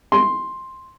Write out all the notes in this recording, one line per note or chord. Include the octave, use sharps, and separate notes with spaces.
C6